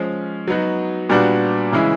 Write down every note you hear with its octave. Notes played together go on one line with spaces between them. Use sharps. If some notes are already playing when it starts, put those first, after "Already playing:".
Already playing: F3 G#3 C#4
F#3 B3 D#4 F#4
A#2 G3 B3 D4 F#4
C#3 E3 G#3 C#4 E4